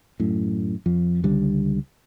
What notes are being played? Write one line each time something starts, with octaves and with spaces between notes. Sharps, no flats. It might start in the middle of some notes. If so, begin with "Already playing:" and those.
F#2 A2
F2 F3
C#2 D3 G3